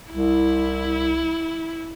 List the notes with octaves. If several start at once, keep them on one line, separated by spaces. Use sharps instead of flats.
C2 E4